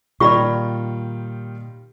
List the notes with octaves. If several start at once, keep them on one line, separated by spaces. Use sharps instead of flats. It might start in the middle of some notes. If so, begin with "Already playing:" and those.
A#2 D#3 G3 F4 D5 B5 C#6